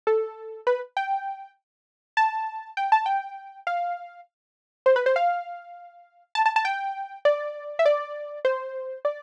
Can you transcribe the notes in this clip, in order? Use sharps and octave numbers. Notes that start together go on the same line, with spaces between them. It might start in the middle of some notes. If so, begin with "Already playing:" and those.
A4
B4
G5
A5
G5
A5
G5
F5
C5
B4
C5
F5
A5
A5
A5
G5
D5
E5
D5
C5
D5